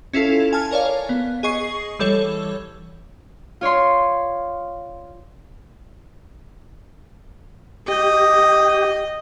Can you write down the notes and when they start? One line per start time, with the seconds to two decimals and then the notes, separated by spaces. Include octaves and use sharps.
0.13 C#4 E4 F4 A4
0.53 G#5 A5 F6
0.71 A#4 C#5 D5 F5
1.09 B3
1.43 G#4 D#5 C#6 C7
1.99 E3 G3 A4 C#5
3.61 F4 C#5 D5 C6
7.88 G4 D#5